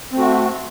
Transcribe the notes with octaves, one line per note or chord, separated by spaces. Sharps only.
A3 C4 F#4